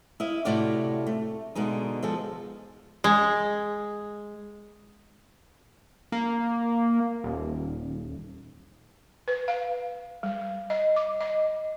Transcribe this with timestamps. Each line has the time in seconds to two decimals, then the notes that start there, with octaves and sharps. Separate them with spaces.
0.20 E4 D#5 F5
0.45 A2 C3 F#4 G4 D5 F5
1.07 A3
1.55 B2 D3 G#3 D#4
2.03 F3 G#3 A4
3.04 G#3
6.12 A#3
7.24 D#1
9.28 B4
9.48 F5
10.23 G3
10.70 D#5
10.96 D6
11.21 D#5